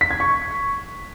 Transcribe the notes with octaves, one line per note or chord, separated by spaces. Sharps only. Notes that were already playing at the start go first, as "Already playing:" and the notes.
B6
G#6
C#6